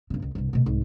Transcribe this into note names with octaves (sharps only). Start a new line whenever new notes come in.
G1 C#3
C#2
C2 G2
B2 A3
C2 G#2